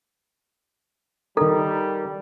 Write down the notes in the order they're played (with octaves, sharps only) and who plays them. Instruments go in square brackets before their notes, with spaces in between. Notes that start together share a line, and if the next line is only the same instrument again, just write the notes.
[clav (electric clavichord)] D#3 A#4 [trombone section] G3 [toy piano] A4